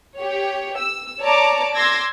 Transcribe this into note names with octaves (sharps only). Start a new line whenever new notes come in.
G4 C#5
E6
C#5 D5 A5 A#5 D6
C6 D6 E6 G#6 A#6